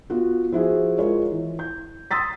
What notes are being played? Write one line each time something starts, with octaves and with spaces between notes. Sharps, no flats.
B3 F4 F#4
F3 E4 F#4 G#4
G#3 F4 A#4 C#5
E3
G6
C6 D#6 E6 A6 B6